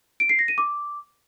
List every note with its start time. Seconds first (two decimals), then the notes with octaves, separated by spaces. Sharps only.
0.20 D7
0.29 C7
0.39 A#6
0.48 D#7
0.58 D6